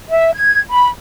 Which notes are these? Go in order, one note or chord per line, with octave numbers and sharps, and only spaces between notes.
E5
G#6
B5